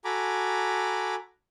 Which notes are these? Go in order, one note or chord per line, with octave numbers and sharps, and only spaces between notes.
F#4 A4 G#5 A#5 B5 D6